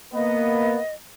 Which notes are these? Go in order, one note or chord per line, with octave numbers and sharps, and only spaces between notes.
A#3 B3 D#5